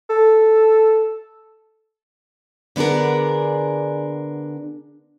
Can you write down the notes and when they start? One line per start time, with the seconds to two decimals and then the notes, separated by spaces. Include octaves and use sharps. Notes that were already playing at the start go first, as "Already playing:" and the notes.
0.10 A4
2.76 D3 B3 D4 G#4 A#4